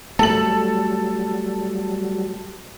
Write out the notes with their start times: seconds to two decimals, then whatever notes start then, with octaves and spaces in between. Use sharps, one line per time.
0.19 F#3 G3 A3 A4 F#7